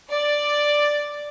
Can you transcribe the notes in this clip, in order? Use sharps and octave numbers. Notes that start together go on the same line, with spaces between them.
D5